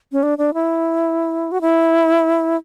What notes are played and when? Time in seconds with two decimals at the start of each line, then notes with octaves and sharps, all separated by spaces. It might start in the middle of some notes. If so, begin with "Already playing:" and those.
0.12 C#4
0.23 D4
0.38 D4
0.54 E4
1.52 F#4
1.61 E4